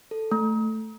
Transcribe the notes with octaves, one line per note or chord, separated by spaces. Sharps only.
A4
A3